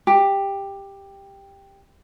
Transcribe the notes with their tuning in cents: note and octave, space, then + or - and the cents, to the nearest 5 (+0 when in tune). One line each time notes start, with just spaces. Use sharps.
G4 +10